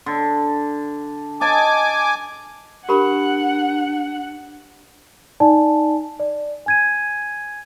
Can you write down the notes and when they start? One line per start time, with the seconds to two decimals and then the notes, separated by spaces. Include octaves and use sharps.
0.06 D3
1.41 D#5 G#5 A5 D6
2.89 D4 G4 A#4 F#5 B5
5.40 D#4 D5 G#5 A5
6.20 D5
6.66 G#5 G#6 D#7